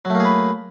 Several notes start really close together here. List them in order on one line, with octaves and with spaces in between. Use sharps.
F#3 A3 A#3 G#4 B4